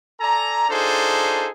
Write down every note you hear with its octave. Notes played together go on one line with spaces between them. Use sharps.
A4 D5 G#5 A#5
D4 D#4 F4 G#4 A4 C5